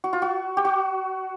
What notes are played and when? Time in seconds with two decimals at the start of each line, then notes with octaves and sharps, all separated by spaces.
0.04 F#4
0.13 F4
0.22 F#4
0.57 G4
0.65 F#4